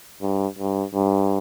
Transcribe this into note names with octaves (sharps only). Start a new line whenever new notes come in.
G2
G2
G2